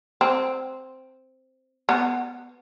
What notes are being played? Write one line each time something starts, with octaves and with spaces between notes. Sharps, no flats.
C4
B3